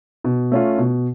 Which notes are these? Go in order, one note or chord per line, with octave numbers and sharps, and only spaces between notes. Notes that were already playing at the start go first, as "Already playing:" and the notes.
B2
A3 C#4 F4
B2